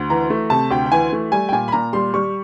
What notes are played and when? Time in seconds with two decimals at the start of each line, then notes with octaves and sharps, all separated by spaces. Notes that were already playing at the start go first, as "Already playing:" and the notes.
Already playing: D2
0.10 E3 A#5
0.30 A3
0.50 C3 A5
0.70 D2 G5
0.86 G5
0.92 E3 G#5
1.12 A3
1.32 G3 G#5
1.49 G5
1.52 A#2 G#5
1.68 B5
1.72 A#2 A#5
1.93 G3 C6
2.14 G3 C#6